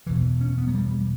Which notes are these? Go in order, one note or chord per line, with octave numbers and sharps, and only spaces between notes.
F#1 E2 B2 E3
C#4
B3
F#3
G3
G3